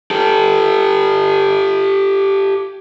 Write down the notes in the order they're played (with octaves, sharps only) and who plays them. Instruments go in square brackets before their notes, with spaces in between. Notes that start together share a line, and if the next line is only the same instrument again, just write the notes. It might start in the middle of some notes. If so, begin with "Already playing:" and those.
[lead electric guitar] G4 A4